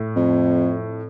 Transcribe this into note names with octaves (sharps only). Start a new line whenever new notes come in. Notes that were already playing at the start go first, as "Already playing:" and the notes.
Already playing: A2
F2